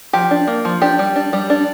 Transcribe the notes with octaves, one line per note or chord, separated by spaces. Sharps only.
F3 G4
D4
A#3
F3
D4 G4
G3
D4
G3
D4